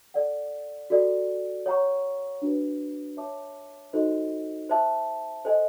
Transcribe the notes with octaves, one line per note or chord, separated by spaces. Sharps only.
A4 D5 F#5
F#4 A4 D5
C#5 F#5 A#5 C#6
D4 F#4 B4
C#5 E5 A5 D6
D#4 F#4 A4 C5 D#5
C5 E5 A5
A4 C5 D#5 G#5